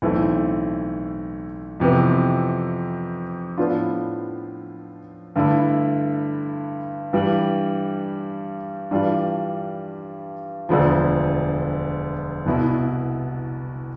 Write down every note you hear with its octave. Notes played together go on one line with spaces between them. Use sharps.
B1 A2 E3 A3 C4
F2 C3 E3 B3
A2 F3 B3 D4 F4
G2 D3 A3 E4
G2 E3 G3
G2 E3 G3 D4 F4
E1 D2 D3 F3
C2 B2 B3 E4